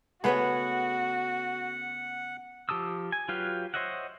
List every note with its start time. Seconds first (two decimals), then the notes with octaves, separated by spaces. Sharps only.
0.24 C#3 A3 B3 F#4 G#4 B4 C#5 F#5
2.69 F3 G4 A5 D#6 E6
3.12 G#5
3.29 F#3 F4 G4 B4 F5
3.74 C5 C#5 D#5 E5 F#5